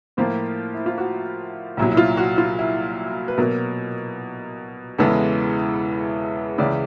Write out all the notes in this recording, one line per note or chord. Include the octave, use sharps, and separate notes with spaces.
A2 F3 A#3 F4
E4
F4
F#4
C2 A#2 F#3 E4
E4
F4
F#4
F4
E4
B4
B2 F#3 A#3 A#4
E2 C#3 E3 G#3 B3 A4
C#2 C#3 E3 D5